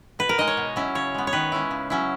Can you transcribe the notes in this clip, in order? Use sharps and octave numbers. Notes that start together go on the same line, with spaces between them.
B2 B4
A#4
G#3 D#4 D#5
C#5
B2
F#3 C#4 E4
C#3 C#5
G#3 B3
C#5
D#3 B4
G#3 C#4 E4
C#3
F#3 C#4 E4